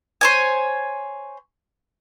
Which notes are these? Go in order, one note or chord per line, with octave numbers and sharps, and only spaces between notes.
C5 C#5 G#5